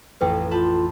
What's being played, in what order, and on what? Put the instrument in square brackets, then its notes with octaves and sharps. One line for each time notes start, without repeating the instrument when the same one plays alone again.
[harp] A1 F2 [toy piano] B4 G5
[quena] F4 [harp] A5 B5 G6